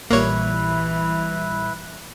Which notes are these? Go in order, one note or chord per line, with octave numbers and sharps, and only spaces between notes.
A#1 A#2 E3 G3 A#3 E4 B4 C#5